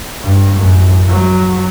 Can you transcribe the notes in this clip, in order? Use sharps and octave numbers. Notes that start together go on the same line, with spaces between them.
G2
A1 F#2
F#3